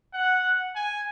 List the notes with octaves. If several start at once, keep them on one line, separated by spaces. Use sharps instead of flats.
F#5
G#5